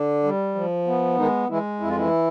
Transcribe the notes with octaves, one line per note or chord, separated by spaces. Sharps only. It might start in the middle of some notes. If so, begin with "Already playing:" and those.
Already playing: D3 D4
G3
F3
B3
D#3 G#3 D#4
E3 G#3 E4
F2 E4
F4
E3 E4